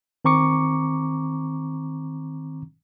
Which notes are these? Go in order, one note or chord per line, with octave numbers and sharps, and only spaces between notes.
D#3 C4 A#5 C#6 D6 C#7